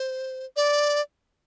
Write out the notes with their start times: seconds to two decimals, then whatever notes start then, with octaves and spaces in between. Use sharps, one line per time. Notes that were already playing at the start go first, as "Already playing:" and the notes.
Already playing: C5
0.56 D5